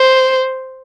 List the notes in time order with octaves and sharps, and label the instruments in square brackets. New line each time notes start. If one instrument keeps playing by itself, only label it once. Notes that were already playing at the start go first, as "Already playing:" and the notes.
Already playing: [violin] C5